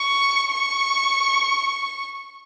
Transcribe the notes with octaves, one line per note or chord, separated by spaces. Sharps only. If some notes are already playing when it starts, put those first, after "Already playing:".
Already playing: C#6
C#6